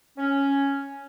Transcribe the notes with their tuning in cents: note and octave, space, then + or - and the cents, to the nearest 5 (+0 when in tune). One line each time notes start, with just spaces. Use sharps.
C#4 +0